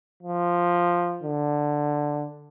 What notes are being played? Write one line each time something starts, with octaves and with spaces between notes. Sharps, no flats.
F3
D3